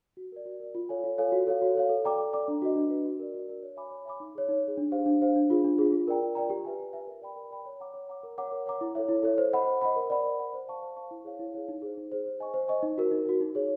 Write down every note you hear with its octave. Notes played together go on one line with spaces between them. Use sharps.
F#4
A#4 D5
F#4
A#4 D5
F4
A4 C#5 F5 G#5
F4
A4 C#5 F5 G#5
F#4
A4 C#5 F5
F#4
A4 C#5 F5
A4
D5 G5 A#5 D6
A4
D5 G5 A#5 D6
D4
F#4 B4 D#5
D4
F#4 B4 D#5
F#4
A#4 D5
F#4
A#4 D5
C#5
E5 G#5 B5 D6
C#5
E5 G#5 B5 D6
D#4
G#4 C#5
D#4
G#4 C#5
D4
G4 C5 F5
D4
G4 C5 F5
D4
F4 G#4
D4
F4 G#4
F4
A#4 D5 G5 A#5
F4
A#4 D5 G5 A#5
G4
B4 E5 G#5
G4
B4 E5 G#5
A#4
D5 G5 B5
A#4
D5 G5 B5
C#5
F#5 A#5 D6
C#5
F#5 A#5 D6
A#4
C#5 F#5 A#5 D6
A#4
C#5 F#5 A#5 D6
E4
A4 C#5 E5
E4
A4 C#5 E5
C5
D#5 F#5 B5
C5
D#5 F#5 B5
A#4
D5 F#5 B5
A#4
D5 F#5 B5
C5
F5 A5 C#6
C5
F5 A5 C#6
E4
G#4 C#5 F5
E4
G#4 C#5 F5
D#4
G#4 C5
D#4
G#4 C5
C5
D#5 G#5 C#6
C5
D#5 G#5 C#6
D#4
F#4 A#4
D#4
F#4 A#4
D#4
G#4 C#5